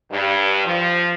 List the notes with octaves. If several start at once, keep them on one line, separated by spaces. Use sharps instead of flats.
G2
F3